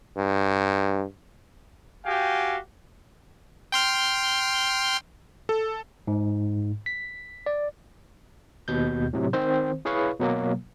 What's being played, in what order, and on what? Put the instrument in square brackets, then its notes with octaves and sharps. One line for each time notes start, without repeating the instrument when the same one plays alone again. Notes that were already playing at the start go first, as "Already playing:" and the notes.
[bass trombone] G2
[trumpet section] F#4 G4 F5 G5 G#5
[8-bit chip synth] G5 C6 F6
[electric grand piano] A4
[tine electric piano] G#2
B6
D5
D#2 B2 G6
A2 C3 F#3
D#3 C4 C5
E4 G#4 B4 C#5 F5 C#6
B2 F#3 A#3